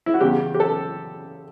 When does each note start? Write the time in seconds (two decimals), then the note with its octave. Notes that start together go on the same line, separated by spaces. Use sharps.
0.06 E4
0.14 F#4
0.20 E2 C#3 G3 G4
0.54 G4
0.60 A4